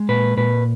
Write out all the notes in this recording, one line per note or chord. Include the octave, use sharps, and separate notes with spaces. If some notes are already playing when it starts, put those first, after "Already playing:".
Already playing: G#3
A#2 B4
A#2 B4